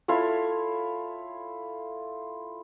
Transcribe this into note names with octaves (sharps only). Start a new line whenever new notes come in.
E4 F4 A4 C#5